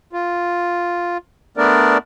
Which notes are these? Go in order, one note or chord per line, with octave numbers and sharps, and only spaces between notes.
F4
A3 B3 D4 A#4 D5